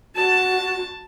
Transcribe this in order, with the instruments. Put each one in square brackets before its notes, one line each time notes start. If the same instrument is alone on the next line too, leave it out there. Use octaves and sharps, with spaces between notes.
[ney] F#4 [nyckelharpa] A5